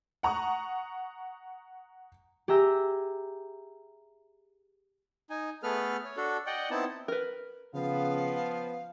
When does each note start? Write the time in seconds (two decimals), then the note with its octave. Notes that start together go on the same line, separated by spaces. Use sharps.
0.23 F#5 A#5 C#6 D#6
2.48 G4 G#4 E5 A#5 E6 G6
5.30 D#4 G#5
5.63 A3 B3 G#4 A4 B4 F6
6.04 C#5
6.17 D4 F#4 A4
6.47 D5 D#5 F#5 G5
6.70 B3 C4 D#4 E4 A5
7.08 A#4 B4
7.74 C#3 F3 B3 F5